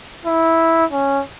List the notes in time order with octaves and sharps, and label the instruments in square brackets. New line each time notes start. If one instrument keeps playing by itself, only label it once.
[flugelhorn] E4
C#4